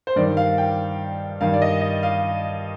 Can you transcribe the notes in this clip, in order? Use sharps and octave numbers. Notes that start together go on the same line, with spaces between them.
C5
G2 D#3 D5
F5
G5
G2 D#3 F5
D5
D#5
D#5
F5